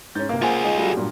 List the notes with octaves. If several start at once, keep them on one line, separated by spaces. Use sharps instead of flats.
G#2 C#4 G6 A6
C3 A#3 F5
A#3 F4 G#4 C5 F#5 G#5
G#3 D#4
F#3 G3 A3
G2 A#2